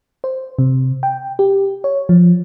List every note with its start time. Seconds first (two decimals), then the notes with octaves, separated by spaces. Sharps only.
0.24 C5
0.59 C3
1.03 G5
1.39 G4
1.84 C#5
2.09 F3